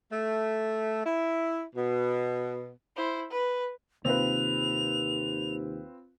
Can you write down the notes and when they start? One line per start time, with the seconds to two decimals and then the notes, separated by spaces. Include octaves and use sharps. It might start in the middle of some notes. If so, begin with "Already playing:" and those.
0.12 A3
1.06 E4
1.75 B2
2.96 E4 C5
3.31 B4
4.05 D#2 C3 D#3 A#3 C4 F4 B4 F7